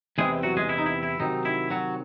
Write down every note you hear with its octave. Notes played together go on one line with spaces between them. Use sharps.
E2 C3 E3 G#3 C4 G#4
F#3 F#4
G#3 G#4
E4
D#4
E4
E4
C3 D#3 F#3 C4 D#4
E4
F#3 F#4